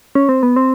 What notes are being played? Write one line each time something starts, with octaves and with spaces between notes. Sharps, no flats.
C#4
C4
B3
C4